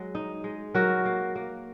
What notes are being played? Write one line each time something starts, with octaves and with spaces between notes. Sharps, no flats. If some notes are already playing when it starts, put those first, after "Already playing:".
Already playing: F#3 G#3
D#4
G#3
F#3 F#4 A#4
A#3
A#3